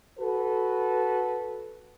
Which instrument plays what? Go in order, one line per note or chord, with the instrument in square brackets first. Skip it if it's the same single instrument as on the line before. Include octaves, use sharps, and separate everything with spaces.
[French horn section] F#4 A4 B4